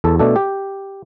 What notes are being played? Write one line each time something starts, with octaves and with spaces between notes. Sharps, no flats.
E2 A4
B2 A3 D4 A4
G4